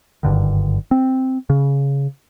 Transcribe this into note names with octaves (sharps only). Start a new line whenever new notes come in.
F#1 G2 D3 D#3
C4
C#3